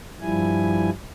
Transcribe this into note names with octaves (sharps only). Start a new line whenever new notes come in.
G2 F3 G3 E4 G#5